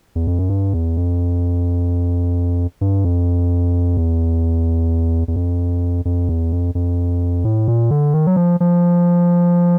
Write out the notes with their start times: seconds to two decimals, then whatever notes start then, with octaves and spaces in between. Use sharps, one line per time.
0.15 E2
0.27 F2
0.39 F#2
0.49 G2
0.74 E2
0.97 F2
2.81 G2
3.05 F2
3.97 E2
5.28 E2
5.36 F2
6.05 F2
6.29 E2
6.52 F2
6.75 F2
7.44 A2
7.68 A#2
7.91 D3
8.14 D#3
8.27 F#3
8.36 F3
8.60 F3